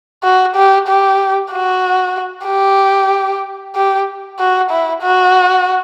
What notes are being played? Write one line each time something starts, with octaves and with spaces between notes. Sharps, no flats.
F#4
G4
G4
F#4
G4
G4
F#4
E4
F#4